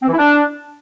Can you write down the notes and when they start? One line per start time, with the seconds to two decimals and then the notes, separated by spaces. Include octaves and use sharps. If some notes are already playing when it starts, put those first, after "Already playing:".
0.02 C4
0.08 E3
0.13 E4
0.18 D4